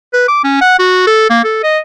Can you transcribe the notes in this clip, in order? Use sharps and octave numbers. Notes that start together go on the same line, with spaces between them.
B4
D6
C#4
F#5
F#4
A4
A#3
A4
D#5